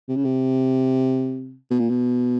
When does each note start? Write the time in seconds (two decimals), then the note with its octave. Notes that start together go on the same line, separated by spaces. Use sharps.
0.09 C3
0.16 C#3
0.25 C3
1.71 B2
1.80 A#2
1.89 B2